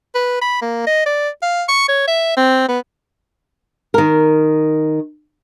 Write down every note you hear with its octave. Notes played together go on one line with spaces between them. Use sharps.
B4
B5
A#3
D#5
D5
F5
C#6
C#5
E5
C4
B3
D#3 A#4